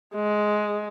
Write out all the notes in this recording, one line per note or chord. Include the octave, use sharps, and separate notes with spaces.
G#3